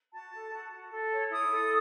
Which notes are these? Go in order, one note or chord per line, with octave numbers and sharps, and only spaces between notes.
F#4 A5
A4
F#4
F#4
A4
C#5
E4 D#6
A4